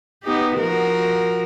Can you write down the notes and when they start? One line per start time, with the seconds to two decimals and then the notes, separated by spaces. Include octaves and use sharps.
0.23 B3 D#4 G4
0.58 F3 F#4 A#4